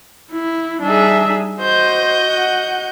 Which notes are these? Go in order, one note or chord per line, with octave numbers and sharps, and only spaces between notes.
E4
G3 D4 D#4 G#4 E5
F#4 C5 D#5 G6
F#5